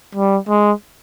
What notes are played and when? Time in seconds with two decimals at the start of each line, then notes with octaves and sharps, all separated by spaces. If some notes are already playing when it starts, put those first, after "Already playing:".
0.15 G3
0.48 G#3